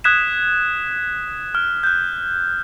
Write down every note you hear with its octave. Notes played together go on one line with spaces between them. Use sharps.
D#6 F#6 G#6 B6 E7
F6
F#6 G6